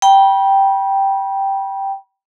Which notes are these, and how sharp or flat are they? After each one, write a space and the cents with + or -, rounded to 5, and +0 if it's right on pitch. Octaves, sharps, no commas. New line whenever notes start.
G5 -5 B5 -35